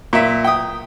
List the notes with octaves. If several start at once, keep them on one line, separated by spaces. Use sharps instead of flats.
A#2 E5
G5 D#6